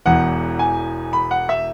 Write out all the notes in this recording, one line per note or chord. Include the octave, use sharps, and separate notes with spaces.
E1 E2 E3 F#5
G#5
B5
F#5
E5